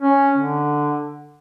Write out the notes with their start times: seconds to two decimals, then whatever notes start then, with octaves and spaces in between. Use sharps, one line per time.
0.01 C#4
0.38 D3